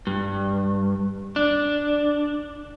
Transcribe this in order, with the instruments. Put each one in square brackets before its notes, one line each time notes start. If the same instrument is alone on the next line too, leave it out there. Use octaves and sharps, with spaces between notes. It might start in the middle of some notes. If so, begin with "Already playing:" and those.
[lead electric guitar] G2
D4